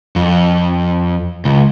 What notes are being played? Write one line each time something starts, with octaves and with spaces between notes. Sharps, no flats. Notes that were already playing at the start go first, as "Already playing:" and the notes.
F2
C#2